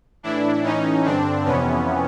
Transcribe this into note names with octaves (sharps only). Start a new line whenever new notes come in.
A2 E3 D4 E4
A2 E3 C#4 D#4
G2 D3 C4 D4
F2 C3 E3 B3 C#4